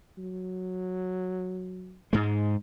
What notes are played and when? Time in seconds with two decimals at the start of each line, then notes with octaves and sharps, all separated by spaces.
0.18 F#3
2.13 G#2 G#3